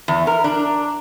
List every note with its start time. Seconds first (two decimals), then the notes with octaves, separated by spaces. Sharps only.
0.08 E2
0.27 A#4
0.44 D4